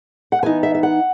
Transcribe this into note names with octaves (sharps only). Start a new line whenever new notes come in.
F#5
E3 B3 D#4 G#5
E5
E5
F#5